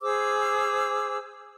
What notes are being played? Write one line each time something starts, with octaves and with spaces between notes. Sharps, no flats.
G#4 C5 D6 E6